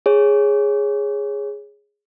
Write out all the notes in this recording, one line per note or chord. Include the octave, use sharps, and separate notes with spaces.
G#4 C#5